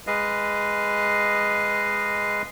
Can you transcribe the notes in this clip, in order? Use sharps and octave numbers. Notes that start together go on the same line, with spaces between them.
G#3 B4 D#5 F5